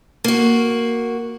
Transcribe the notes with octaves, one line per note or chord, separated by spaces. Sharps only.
A#3 F#4